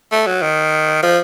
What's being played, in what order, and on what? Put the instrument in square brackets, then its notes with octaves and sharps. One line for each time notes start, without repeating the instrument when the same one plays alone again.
[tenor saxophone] A3
F#3
D#3
F3